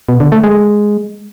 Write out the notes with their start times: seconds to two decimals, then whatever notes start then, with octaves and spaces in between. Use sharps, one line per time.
0.09 B2
0.20 D3
0.32 A3
0.44 G#3